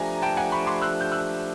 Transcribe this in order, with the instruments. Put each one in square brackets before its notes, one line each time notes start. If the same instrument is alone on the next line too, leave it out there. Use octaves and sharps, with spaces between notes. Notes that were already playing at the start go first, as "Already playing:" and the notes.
Already playing: [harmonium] F3 A3 D4 G4 [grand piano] G#5 A#5
[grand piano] G5 A5
F#5 G#5
B5 C#6
C6 D6
E6 F#6
G6
E6 F#6